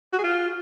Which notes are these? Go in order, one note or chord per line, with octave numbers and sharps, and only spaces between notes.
F#4
G#4
F4